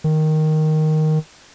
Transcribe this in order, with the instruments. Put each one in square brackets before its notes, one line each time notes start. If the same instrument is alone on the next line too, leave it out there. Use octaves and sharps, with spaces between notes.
[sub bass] D#3